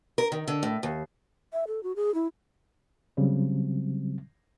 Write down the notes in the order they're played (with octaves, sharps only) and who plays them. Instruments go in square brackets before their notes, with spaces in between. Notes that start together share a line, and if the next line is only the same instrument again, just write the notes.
[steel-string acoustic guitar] A#4
D#3
D3
A2
D#2
[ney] E5
A4
F#4
G#4
E4
[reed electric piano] C#3 F#3 G3 C4